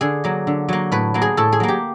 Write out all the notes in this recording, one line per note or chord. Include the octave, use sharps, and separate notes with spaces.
D3 G#4
F#3 A#3
D3
F#3 A#3
A2 B4
F#3 A#3
G#4
A2 A4
G#4
F#3 A#3
G4